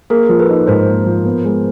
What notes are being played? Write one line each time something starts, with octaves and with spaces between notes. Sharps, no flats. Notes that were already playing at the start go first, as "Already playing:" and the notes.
A#3 G#4 A#4
F3
A4 B4
D#4
G#2 A#4 C5
A#3
F3
B3
G#3